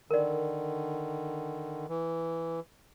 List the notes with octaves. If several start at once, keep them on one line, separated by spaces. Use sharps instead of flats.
D3 D#3 A#4 D5
E3